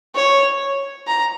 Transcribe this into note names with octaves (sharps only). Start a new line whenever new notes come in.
C#5
A#5